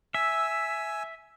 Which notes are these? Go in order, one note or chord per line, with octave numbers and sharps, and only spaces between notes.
E5 G#5 E6